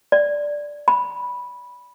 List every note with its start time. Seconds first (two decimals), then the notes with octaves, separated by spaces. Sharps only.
0.12 D5
0.88 B5